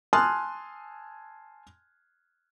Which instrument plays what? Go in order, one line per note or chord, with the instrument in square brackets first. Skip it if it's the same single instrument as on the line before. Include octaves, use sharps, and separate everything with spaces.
[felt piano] G#5 A5 C6 D#6 F6 F#6